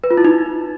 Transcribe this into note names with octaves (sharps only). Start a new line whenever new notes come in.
B4
F4
E4
D#4